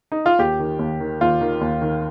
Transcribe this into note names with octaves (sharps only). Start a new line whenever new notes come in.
D#4
F4
D#2 G4
D#3
D#2
D#3
D#2 F4
D#3
D#2
D#3